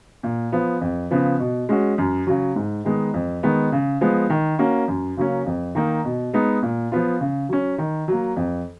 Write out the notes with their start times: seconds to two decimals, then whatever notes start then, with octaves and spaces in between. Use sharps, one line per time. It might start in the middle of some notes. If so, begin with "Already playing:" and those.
0.23 A#2
0.52 F3 B3
0.81 F2
1.11 C#3 F3 B3
1.39 B2
1.69 G#3 C#4 F#4
1.98 F#2
2.27 C#3 F#3
2.56 G#2
2.85 D#3 G#3 B3 D#4
3.14 F2
3.43 D#3 G#3 B3
3.72 C#3
4.01 F3 G#3 B3
4.30 D#3
4.59 A#3 C#4 F#4
4.88 F#2
5.17 C#3 F#3 A#3 C#4
5.46 F2
5.75 D#3 A#3 D#4
6.05 B2
6.33 G#3 B3 D#4
6.63 A#2
6.92 F3 B3 F4
7.21 C#3
7.49 F#3 C#4
7.78 D#3
8.08 F#3 A#3
8.36 F2